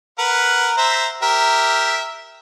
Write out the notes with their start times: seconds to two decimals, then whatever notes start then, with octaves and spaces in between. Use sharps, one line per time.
0.19 A#4 B4 F#5
0.77 C5 E5 A#5
1.22 G4 A#4 E5